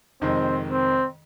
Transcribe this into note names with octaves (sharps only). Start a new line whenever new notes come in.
F2 C3 D#3 G#3 C4
C4